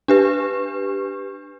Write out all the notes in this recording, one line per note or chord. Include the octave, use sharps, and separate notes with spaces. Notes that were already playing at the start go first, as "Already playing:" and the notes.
D4 G4 B4